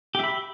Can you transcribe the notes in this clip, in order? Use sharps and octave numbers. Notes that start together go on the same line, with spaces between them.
G4 E5 B5